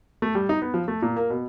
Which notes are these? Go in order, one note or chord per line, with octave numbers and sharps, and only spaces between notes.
A3
G3
D#4
B3
F3
A3
A#2
A#3
B2